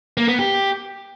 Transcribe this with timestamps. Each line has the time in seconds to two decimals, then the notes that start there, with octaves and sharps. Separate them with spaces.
0.17 A#3
0.28 B3
0.39 G4